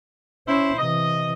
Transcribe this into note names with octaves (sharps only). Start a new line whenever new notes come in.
C#4 E4 C5
C3 E3 D#5